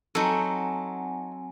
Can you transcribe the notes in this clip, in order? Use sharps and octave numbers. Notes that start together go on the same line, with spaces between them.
F#3 C4 D#4 A4 F#5 G#5